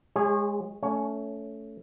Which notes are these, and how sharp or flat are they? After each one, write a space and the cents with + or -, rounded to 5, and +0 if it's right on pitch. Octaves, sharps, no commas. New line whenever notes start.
G#3 +0 G#4 -35 C#5 -20
A3 +0 C#4 +15 C#5 +0